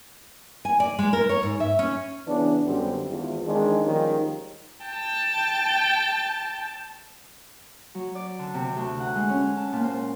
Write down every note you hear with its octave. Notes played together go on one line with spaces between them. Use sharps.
G#5
D5
G#3
A#4
C#5
G#2
E5
C#4
C#3 E3 B3 C#4 D4
F#2 D3 G3 B3 C4
G#1 E2 F3
D#3 E3 G#3 C4 D4
D#3 F3 G3 G#3 A#3 C#4
G5 A5
F#3
D5
D3
C3
D2
F#5
G#3
C#4
A5
A#2
C5